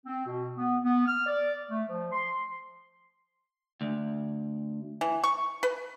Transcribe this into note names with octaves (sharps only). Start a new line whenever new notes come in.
C4
B2
B3
B3
F6
D5
A3
F3
C6
D2
E3
C#6
B4